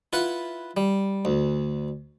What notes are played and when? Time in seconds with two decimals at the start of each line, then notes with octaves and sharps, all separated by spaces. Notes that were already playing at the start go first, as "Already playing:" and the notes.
0.13 E4 F4 B4 F#5
0.77 G3
1.25 D2